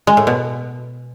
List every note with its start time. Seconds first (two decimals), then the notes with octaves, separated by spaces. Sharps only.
0.07 G#3
0.17 A2
0.27 B2